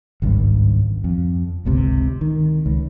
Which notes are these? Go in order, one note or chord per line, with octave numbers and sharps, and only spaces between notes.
G#1 C#2 G2
F2
G1 C#2 C3
D#3
C#2